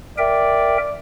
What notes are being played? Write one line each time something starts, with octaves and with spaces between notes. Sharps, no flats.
A#4 D5 E5 G5